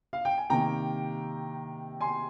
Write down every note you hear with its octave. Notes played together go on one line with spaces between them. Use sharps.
F5
G5
G#5
C3 D#3 A#3 G5 A#5
G#5 C6